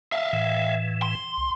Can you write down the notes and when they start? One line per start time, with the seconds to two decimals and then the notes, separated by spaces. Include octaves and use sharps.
0.12 E5 F5 A5
0.33 A2 E3
1.02 C6
1.38 C2